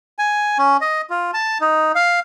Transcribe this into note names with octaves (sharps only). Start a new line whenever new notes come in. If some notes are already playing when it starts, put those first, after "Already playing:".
G#5
C#4
D#5
F4
A5
D#4
F5